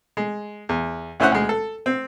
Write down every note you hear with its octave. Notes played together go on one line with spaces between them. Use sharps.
G#3
E2
D2 C#4 E4 C5 C#5 F#5
D2 G#3
A4
C4